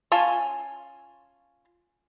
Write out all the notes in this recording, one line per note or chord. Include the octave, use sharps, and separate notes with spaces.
C#4 F4 G#5 A5